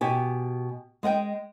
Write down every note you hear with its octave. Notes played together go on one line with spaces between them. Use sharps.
B2 G4 G#5
G#3 D#5 F#5 G5